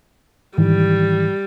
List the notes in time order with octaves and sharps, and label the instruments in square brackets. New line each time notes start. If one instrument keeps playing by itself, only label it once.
[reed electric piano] G#2 D#3 E3 [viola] G3